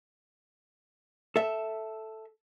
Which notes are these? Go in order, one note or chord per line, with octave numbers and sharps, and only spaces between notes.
A4 E5